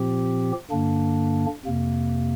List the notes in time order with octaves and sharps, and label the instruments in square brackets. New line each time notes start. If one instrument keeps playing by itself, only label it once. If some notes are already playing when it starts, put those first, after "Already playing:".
Already playing: [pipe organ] A#2 F3 C4 G4
G2 D3 A#3 D4
F2 C3 A#3